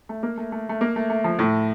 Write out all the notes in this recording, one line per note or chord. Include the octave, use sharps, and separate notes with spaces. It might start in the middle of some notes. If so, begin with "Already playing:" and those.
A3
A#3
A3
A3
A3
A#3
A3
A3
F3
A2